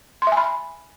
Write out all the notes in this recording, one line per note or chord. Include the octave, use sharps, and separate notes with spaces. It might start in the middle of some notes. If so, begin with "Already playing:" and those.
C6
E5
G#5
B5